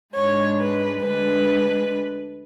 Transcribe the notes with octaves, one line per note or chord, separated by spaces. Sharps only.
G#2 G#3 D4 C#5
B4
D2 D3 G#3 D4 B4